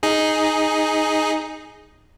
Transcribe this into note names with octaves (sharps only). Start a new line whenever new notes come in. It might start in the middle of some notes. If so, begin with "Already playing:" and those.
D#4 G#4